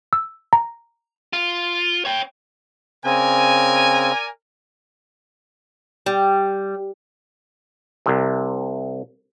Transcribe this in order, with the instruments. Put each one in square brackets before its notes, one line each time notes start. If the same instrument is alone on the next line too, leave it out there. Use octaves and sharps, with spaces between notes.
[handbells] E6
A#5
[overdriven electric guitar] F4
C#5 G5
[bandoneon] C#3 C4 [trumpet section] A#4 D5 G#5
[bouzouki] G3
[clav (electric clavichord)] C2 C3